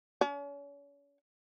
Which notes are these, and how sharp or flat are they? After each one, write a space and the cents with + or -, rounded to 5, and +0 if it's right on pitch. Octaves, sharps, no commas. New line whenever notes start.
C#4 +40